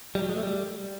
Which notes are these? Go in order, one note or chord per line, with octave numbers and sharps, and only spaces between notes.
G3
F#3
G#3
A3
G3